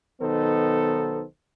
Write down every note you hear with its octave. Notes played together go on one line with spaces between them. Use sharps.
B1 D#3 B3 D#4 A4 C5